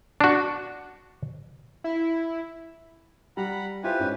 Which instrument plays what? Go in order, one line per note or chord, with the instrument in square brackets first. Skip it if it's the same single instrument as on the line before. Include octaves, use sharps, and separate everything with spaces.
[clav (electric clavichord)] D4 F#4
[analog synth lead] E4
[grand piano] G3 [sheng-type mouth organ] F#5 A#5 B5
[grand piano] E4 F4 C5 [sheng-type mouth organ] G4 B4 G#5
[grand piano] G#2 C#4 D#4